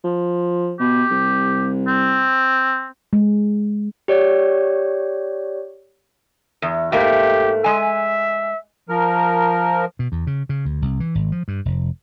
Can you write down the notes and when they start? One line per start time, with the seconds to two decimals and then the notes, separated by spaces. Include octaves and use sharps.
0.04 F3
0.80 B2 G4
1.11 C2
1.88 C4
3.13 G#3
4.08 G4 C#5 D5
6.62 E2
6.92 G#2 A3 A#3 G4
7.64 G#3 E5 G#5
8.89 F3 A#4
9.99 B2
10.12 E2
10.27 C#3
10.49 C#3
10.65 D2
10.82 C2
11.00 E3
11.15 G#1
11.32 F3
11.48 G2
11.65 F1